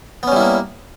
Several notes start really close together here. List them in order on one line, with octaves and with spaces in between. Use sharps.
B3 C#4 G3 E4 A#3